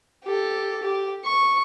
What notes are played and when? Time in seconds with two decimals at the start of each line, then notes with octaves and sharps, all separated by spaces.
0.24 G4 A4
0.83 G4
1.25 C#6